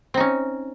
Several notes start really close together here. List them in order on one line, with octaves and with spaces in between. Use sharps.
C4 D#4 C#4